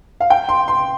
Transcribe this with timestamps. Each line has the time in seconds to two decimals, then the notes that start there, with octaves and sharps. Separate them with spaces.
0.20 F5
0.30 G5
0.49 C6
0.68 C6